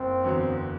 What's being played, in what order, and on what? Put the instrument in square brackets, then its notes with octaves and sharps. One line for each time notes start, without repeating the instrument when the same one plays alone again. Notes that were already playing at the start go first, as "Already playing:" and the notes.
Already playing: [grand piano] F#1 [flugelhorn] C4
[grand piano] E2 D3 F#3 B3